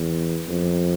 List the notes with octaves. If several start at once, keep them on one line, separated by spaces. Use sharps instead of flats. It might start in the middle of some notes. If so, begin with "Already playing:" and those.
Already playing: E2
F2